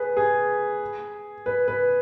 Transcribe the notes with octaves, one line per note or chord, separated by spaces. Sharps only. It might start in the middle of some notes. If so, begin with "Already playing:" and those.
Already playing: G#4 B4
G#4
B4
B4